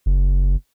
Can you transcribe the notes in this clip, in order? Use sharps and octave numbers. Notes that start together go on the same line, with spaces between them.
F#1